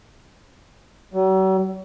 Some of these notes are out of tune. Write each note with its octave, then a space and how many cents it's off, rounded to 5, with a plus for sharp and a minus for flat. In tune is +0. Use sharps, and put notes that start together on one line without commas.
F#3 +45